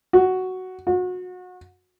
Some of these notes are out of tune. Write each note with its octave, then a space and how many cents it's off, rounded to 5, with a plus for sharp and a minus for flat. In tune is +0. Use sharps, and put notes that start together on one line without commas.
F#4 +5
F#4 -30